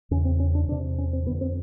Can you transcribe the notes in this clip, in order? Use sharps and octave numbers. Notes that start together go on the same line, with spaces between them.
E2 C#3 C#4
C4
C#4
D4
E2 C3 D4
C#4
C4
F2 D3 B3
C4